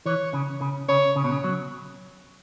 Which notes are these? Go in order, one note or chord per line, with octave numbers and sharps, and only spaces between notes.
E3 C#5
C#3
C#3
C#3 C#5
C#3
B2
C#3
F#3